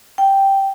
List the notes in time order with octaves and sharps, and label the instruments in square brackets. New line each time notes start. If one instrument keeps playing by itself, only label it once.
[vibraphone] G5